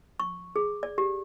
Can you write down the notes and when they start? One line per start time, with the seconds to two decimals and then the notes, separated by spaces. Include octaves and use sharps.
0.20 C#6
0.56 G#4
0.83 D5
0.98 G4